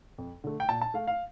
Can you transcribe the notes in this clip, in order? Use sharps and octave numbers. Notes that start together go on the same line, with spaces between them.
F2
D3 A3
G5
A#2 A5
A5
A3 F5
F5